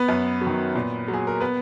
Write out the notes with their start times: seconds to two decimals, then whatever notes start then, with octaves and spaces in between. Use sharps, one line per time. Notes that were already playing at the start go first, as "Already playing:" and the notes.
Already playing: B3 B4
0.08 F#2
0.41 F#3
0.47 D#3
0.75 A#2
1.08 F#3
1.13 G#4
1.27 A#4
1.40 B3 B4